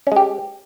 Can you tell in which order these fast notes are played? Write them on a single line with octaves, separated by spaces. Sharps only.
C#4 G#3 G4